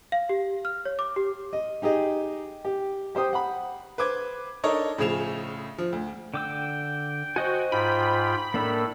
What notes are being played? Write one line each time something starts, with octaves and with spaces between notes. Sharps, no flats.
F5
G4
F6
C#5
D6
G4
D#5
D#4 G4 G#4 D#5
G4
G4 C5 G5 D#6
F#5 B5
B4 C5 D6 G#6
D4 D#4 A4 A#4 C#5 D#5
A2 C#3 F3 G#4 E7 F7
F3
D2
D3 G5 D6 E6
F#4 C5 D#5 G#5
G#2 F4 G5 B5
A2 A#3 D4 A4 A#4